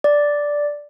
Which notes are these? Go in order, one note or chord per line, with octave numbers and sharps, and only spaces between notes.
D5